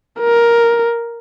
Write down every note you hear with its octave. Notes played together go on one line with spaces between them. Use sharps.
A#4